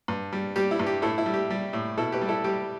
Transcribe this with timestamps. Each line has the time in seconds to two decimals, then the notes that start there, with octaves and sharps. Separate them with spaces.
0.08 G2
0.33 G3
0.56 G3 G4
0.71 E4
0.79 G2
0.86 G4
1.02 A2 E4 A4
1.18 E4
1.26 G3
1.34 G4
1.50 G3
1.73 A2
1.97 B2 E4 A4
2.12 G4 B4
2.21 G3
2.28 E4 A4
2.44 G3 G4